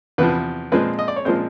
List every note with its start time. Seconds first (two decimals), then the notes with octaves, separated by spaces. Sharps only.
0.18 E2 C3 F3 B4
0.72 A#2 F3 G#3 C4 B4
0.99 D#5
1.08 D5
1.16 C#5
1.25 A#2 F3 G#3 C4 C5